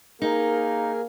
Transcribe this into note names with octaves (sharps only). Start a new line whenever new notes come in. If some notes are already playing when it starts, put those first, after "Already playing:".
A#3 D#4 G#4 A#4